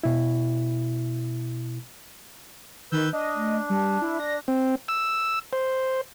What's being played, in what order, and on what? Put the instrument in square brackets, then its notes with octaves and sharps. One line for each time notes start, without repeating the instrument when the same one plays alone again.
[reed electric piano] B2 E4
[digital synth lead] D#3 [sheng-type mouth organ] B4 E6 G6
[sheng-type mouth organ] D4 [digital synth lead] D#5
[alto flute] A3
[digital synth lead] G3 [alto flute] A5
[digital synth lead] E4
[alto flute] D5 [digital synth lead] A#6
[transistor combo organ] C4
E6
C5